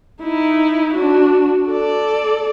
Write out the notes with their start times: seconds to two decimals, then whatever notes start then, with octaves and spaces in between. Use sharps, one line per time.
0.23 D#4 E4
0.94 D4 F#4
1.69 A4 D5